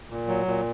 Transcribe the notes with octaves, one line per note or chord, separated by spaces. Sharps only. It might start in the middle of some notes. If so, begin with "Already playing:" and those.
A#2
F#3
A#2